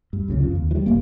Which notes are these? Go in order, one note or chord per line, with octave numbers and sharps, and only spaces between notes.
G2
C#2 A2 C#3
F2 F3
D#2
E3 G3
F1 A#3